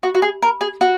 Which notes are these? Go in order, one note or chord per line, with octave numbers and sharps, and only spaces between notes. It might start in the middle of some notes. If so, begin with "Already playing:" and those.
F#4
F#4
G#4
A#4
G#4
F#4